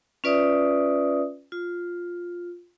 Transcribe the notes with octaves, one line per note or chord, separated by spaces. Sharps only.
C#4 F4 B4 D5 E5 D#6
F4